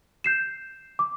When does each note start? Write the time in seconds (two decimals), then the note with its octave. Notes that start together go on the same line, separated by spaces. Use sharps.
0.24 G6 C7 E7
0.99 D6